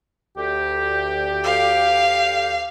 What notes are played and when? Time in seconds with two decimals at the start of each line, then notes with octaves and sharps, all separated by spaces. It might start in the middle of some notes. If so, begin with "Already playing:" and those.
0.37 D2 G4
1.44 F5